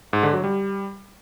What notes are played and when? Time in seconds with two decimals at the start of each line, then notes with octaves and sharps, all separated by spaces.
0.13 G#2
0.23 D3
0.33 F#3
0.44 G3